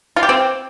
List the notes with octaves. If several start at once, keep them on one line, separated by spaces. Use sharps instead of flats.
F4
G4
C4